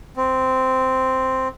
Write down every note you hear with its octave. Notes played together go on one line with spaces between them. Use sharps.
C4